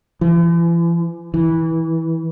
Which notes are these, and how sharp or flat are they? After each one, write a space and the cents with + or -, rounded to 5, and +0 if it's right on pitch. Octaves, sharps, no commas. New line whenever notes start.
E3 +40
E3 -20